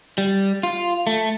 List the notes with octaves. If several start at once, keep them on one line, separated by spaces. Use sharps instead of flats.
G3
F4
A3